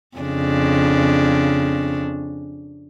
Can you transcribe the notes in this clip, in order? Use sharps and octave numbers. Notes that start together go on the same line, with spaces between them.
F2 C#3 D4